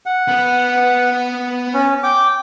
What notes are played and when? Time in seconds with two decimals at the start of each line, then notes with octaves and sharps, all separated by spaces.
0.06 F#5
0.28 B3 B4
1.74 C#4
2.03 G5 D6